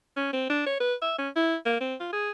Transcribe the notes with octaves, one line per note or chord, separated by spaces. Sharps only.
C#4
C4
D4
C#5
B4
E5
C#4
E4
A#3
C4
F4
G#4